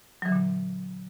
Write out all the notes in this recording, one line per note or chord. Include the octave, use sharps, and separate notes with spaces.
A#2 D3 E3 F#3